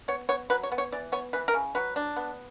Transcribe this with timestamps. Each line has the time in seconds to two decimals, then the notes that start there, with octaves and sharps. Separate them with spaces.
0.08 B3 C#5
0.29 B3 C#5
0.50 F#3 B4
0.63 C#5
0.72 B3
0.78 C#5
0.92 E3 D5
1.12 B3 C#5
1.33 E3 B4
1.48 A#4
1.54 C#3
1.75 F#3 B4
1.96 D4
2.16 B3